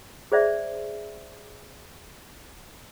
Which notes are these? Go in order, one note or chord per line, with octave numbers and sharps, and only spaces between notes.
G#4 C5 D5 E5